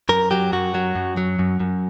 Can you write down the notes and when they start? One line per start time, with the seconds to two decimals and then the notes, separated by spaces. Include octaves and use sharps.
0.09 F#2 A#4
0.31 F#3 G4
0.53 F#2 F#4
0.75 F#3
0.96 F#2
1.17 F#3
1.39 F#2
1.60 F#2